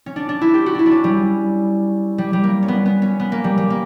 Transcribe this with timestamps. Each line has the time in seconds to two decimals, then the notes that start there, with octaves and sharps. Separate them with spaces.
0.06 C#4
0.16 D4
0.29 D4
0.41 E4
0.54 G4
0.66 F#4
0.75 D4 E4
0.86 D4
0.91 C#4
1.04 G3
2.18 G3
2.33 G3
2.44 A#3
2.63 C#4
2.68 B3
2.86 B3
3.02 C#4
3.20 B3
3.32 A#3
3.44 G3
3.58 G3
3.70 A#3